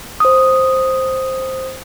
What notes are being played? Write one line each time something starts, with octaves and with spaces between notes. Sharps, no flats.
C5 D#6